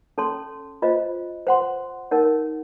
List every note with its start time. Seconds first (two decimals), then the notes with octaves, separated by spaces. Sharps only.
0.18 C#4 A4 C#5 A5 C6
0.82 F4 C5 D#5
1.47 C5 F#5 C6
2.11 D#4 A#4 C#5 F#5